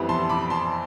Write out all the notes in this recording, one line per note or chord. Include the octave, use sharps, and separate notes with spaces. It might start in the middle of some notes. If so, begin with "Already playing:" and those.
Already playing: F2 E3 G3 B3
A5 C6
B5 D6
A5 C6